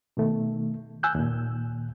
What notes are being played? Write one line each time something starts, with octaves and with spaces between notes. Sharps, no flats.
B2 D#3 A3
G#5 E6 F#6 G6
D#2 A#2